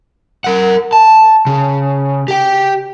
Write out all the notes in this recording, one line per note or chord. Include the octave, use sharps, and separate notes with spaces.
A#4 F#5
A5
C#3
G4 G5